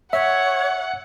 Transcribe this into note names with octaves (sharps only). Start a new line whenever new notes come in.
C#5 E5 F#5